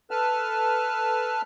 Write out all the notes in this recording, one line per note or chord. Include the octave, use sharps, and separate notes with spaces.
A4 B4 A5 F6